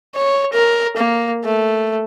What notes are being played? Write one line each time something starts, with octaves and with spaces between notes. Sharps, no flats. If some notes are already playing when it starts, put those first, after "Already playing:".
C#5
A#4
A#3
A3